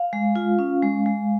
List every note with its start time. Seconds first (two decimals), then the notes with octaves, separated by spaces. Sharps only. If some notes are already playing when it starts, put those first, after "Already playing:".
Already playing: F5
0.13 G#3
0.36 F4
0.59 C#4
0.83 G#3
1.06 G#3